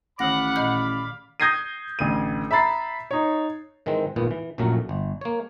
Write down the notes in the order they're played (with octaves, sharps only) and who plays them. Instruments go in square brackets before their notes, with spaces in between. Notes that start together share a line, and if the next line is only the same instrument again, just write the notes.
[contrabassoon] A1 [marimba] D#3 A#6 [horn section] D5 F5 B5 [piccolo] F#5
[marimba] A#2 D#5 G6
[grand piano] D#6 G6 G#6 A#6 C7 D#7
A1 D2 D#7
E5 A#5 B5 A6 C7
D#4 C#5
[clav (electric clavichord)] G#2 D#3 E3 G#3 C4
G#1 E2 A#2 B3
E3
A#1 F#2 A#2 F#3 A3 A#4
G1
A#3 C#5